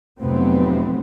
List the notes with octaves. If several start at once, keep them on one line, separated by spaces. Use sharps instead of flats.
F1 A2 F#3 B3 C4